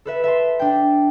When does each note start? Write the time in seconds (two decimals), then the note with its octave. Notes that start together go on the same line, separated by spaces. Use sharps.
0.05 A4 B4 E5
0.24 E5 A5 C6
0.59 D4 G5